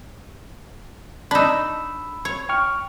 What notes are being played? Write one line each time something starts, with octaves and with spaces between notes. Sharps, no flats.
D4 D#4 B5 E6
C#5
G5 C#6 F6